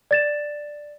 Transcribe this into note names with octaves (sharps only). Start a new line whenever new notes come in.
D5 A6 E7